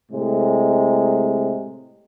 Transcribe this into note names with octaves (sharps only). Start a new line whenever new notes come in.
A2 C3 G#3